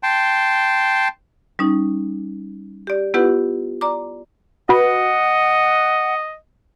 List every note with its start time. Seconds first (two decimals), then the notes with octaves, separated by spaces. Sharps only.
0.03 G5 A5 C6
1.59 G3 C#4 D#4
2.87 G4 D5
3.14 B3 E4 F4 G4 B4 F#5
3.81 D5 A#5 D6
4.69 F#4 B4 D#5 F#5